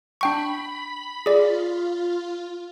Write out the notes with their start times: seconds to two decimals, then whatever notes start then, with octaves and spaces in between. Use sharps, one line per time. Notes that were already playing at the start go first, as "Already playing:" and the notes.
0.21 D4 G5 B5 C#6
1.26 F4 G#4 D5